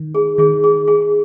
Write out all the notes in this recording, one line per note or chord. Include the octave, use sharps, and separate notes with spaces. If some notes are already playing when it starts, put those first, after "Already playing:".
Already playing: D#3
G#4
D#3 G#4
G#4
G#4